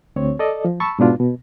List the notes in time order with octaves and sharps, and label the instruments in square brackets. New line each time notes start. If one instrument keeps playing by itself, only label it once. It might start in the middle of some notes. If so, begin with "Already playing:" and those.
[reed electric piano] D2 C4 C#5
A4 D5 D#5
F3
A5 B5 C#6 E6
G#2 B2 D4 F4
B2